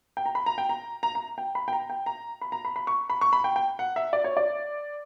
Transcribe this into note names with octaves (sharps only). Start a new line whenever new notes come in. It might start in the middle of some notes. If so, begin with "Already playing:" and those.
G5
A#5
B5
A#5
G5
A#5
A#5
A#5
G5
B5
G5
A#5
G5
A#5
B5
A#5
B5
B5
C#6
B5
C#6
B5
G5
G5
F#5
E5
D5
C#5
D5